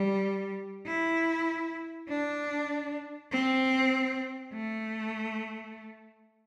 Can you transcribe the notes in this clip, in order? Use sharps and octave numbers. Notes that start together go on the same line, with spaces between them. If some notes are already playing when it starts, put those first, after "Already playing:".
Already playing: G3
E4
D4
C4
A3